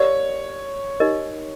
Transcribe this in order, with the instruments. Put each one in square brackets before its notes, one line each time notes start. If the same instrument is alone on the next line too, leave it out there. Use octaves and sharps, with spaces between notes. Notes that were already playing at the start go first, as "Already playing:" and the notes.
Already playing: [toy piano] G4 A#4 D5 F5 [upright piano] C#5
[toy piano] D#4 G4 A#4 D#5